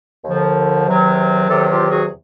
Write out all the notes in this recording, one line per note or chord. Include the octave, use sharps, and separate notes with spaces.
D#2 D3 F3
E2 C3 D#3 F#3
E2 C3 D#3 F#3 G4 A4
F4 G4
F#4 G#4